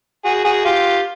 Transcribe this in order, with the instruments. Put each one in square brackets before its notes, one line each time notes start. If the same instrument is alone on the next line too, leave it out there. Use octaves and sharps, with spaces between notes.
[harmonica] F#4 G#4
F#4 G#4
F4 G4